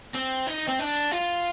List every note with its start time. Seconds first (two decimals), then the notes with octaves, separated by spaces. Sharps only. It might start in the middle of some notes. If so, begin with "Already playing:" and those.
0.15 C4
0.48 D#4
0.68 C4
0.80 D4
1.12 F4